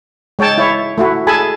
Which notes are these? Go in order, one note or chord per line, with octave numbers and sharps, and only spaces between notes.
G#3 C#5 G5 A5
E4 C#5
A3 E4 F#4
G#4 A4 G#5 A5 B5